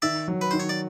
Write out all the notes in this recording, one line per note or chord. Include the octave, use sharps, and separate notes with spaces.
D#3 D5 E5
F#3
B4
D#3 C5
C#5
D5